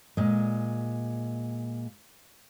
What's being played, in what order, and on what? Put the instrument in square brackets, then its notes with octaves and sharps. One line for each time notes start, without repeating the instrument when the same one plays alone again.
[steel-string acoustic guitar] A#2 G#3